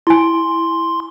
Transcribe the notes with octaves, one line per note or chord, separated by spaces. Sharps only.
E4 G#5 C6